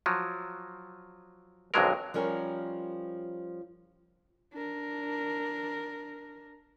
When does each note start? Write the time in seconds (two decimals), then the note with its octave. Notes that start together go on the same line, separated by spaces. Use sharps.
0.06 F3 F#3
1.74 B1 F2 D3 F#3 G#3 A#4
2.14 F3 G3 C#4 A#4
4.53 D4 A#4